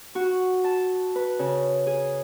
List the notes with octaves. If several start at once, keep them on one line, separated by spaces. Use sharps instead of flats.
F#4
A5
B4
C#3
G#4